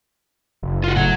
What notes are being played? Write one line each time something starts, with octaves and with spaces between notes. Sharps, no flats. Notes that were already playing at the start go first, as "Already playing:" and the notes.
F#1
F4 F#4
A2 F#3 F#5